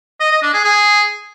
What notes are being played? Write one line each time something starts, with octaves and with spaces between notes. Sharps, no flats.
D#5
D#5
D4
G#4
G#4